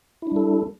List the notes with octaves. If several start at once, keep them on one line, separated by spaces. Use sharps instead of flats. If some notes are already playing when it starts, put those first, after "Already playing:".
G3 D4 E4 A4